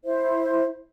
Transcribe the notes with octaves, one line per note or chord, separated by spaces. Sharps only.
E4 C5 E5